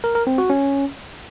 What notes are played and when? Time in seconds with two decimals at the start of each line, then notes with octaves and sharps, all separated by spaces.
0.04 A#4
0.15 A#4
0.27 C4
0.38 F#4
0.50 C#4